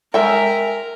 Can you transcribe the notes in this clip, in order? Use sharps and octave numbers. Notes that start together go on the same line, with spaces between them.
G#3 A#4 E5 G5